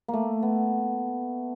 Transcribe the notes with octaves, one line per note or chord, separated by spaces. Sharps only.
A#3
A3
B3